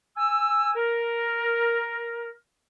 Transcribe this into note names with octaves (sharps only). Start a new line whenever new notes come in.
G#5 E6
A#4